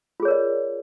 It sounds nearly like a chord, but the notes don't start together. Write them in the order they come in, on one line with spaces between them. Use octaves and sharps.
F4 G#4 C#5 A#4 D5